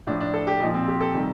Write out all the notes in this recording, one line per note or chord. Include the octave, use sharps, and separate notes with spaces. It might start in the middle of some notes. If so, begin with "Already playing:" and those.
A2 F3 D4
D4
A4
G4
A#2 F3 D#4
C4
G4
A4
C3 D#3 G3